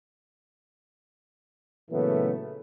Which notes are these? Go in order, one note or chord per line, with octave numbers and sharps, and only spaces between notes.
A#2 C#3 E3 F#3 A3 B3